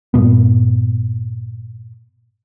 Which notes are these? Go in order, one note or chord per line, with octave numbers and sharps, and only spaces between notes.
G2 A#2 B3